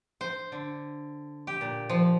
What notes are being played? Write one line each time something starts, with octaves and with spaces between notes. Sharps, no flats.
C5
D3
G4
A#2
F3